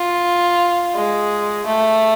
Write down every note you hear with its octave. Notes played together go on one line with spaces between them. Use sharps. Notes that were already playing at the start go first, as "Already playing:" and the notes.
Already playing: F4
G#3
A3